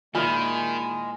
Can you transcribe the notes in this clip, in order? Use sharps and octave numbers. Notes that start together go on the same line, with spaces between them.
A#2 D#3 G#3 E4 F4 G#5 B5 F6